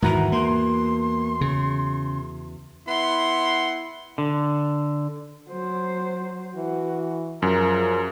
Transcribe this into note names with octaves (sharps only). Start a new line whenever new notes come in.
E2 G#2 D#3 E3 F#4 A#5 B5
A#3 C6
C#3
B3 E4 F#5 C6
D3
F#3 C5
E3 F#4
F#2 F3 G#4 A#4